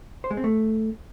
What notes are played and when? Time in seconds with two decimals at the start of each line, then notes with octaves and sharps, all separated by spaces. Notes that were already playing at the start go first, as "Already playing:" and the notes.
0.24 C5
0.31 G#3
0.37 C4
0.44 A3